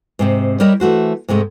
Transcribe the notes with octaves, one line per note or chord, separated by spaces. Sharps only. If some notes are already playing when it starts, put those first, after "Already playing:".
G#2 C3 C4
G3 E4 A#4 C#5 D#5
E3 A3 F#4 C5
G#2 C3 G#3 A3